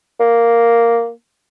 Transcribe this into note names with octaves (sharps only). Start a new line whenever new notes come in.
A#3